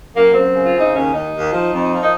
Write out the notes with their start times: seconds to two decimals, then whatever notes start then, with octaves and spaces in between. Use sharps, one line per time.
0.14 F#2 A#3
0.33 F#2 C4
0.54 C#3
0.65 F4
0.73 C#3
0.79 D#4
0.93 D#2 C#4
1.12 D#2 D#4
1.33 D#2
1.53 F3
1.73 F2
1.92 F3
2.03 D#4